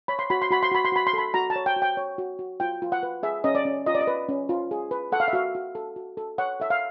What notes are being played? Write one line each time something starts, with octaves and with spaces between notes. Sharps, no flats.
C#5 B5
C6
F#4 B5
C6
F#4 B5
C6
F#4 B5
C6
F#4 B5
C6
A4 B5
F#4 A#5
A5
C#5
G5
F#4
G5
C#5
F#4
F#4
F4 G5
F4
F#5
B4
G#4 E5
C#4 D#5
D5
C#4
F4 D#5
D5
D#5
B4
C#4
F4
G#4
B4
A4 F#5
F5
E5
F#4 F5
F#4
A4
F#4
A4
C#5 F#5
A4 E5
F5